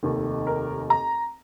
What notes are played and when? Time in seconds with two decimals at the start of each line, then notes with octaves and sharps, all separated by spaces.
0.03 F1 D#2 D#3
0.47 A#4
0.90 A#5